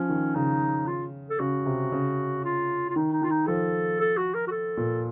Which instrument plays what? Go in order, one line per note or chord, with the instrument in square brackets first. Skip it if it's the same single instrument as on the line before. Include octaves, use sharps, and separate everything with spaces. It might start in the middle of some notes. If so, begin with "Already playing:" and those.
Already playing: [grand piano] F3 [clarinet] C#4
[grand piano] D#3
[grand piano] C#3 [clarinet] D#4
[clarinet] F4
A4
[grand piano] C#3 [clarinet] F#4
[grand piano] C3
C#3
[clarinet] F4
F4
[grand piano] D#3 [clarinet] D#4
[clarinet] D#4
[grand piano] D#3 [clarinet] F4
[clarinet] D#4
[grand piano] F3 [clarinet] A4
[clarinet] A4
F#4
A#4
F#4
A4
[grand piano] A#2